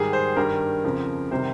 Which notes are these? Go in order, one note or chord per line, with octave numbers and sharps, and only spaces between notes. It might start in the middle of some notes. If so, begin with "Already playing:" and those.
Already playing: G#2 D#3 G3 G#4
C5
G2 D#3 G3 A#4
F2 C#3 F3
C3 D#3 G3 C5